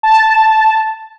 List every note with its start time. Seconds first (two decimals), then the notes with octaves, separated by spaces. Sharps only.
0.03 A5